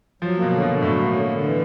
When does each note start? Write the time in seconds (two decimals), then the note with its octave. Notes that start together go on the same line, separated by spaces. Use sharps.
0.22 F3 F#3
0.37 A#3
0.42 B2
0.52 D3
0.62 B2
0.67 D3
0.82 A2 F#3
0.98 A#3
1.13 D3
1.28 D3
1.44 E3